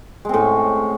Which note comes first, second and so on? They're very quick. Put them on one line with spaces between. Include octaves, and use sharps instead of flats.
G#3 C4 A2 C#4